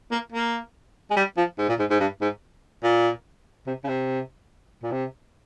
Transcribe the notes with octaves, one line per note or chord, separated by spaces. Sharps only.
A#3
A#3
G#3
G3
F3
G#2
A#2
G#2
G#2
G2
G#2
A#2
C3
C#3
C3
A#2
C3